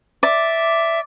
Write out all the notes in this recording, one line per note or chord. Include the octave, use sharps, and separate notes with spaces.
D5 E5